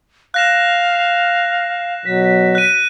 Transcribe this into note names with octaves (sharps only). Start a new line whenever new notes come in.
F5 F#6 A#6 E7
B2 F#3 B6
F#6 D#7